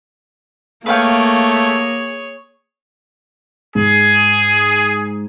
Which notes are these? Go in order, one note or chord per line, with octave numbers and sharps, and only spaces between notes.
A3 A#3 G#4 B4 C#5 F5 G5
G#2 G#4